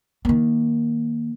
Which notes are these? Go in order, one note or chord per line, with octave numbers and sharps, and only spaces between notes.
D#3 A#3